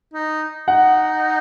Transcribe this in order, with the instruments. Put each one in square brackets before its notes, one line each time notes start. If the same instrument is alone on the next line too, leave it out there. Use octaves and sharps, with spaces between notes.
[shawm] D#4
[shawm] D#4 [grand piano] F#5